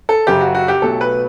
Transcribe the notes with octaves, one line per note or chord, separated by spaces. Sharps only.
A4
F#1 F#2 C#3 G4
F#4
F#4
G4
B1 B2 F#3 A3 A4
B4